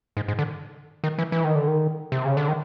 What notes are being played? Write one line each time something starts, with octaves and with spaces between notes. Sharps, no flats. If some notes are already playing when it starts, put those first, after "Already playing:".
G#2
G#2
D3
D#3
E3
E3
D#3
D3
D#3
C3
C#3
D3
D#3